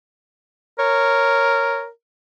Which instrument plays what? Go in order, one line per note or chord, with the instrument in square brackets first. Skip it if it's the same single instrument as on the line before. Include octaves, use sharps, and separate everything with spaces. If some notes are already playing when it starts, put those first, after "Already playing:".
[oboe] A#4 [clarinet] C#5